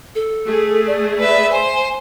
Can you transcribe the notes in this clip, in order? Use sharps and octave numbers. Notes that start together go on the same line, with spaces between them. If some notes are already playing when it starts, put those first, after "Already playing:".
A4
A3 G#4
D5
B4 E5
C5 G#5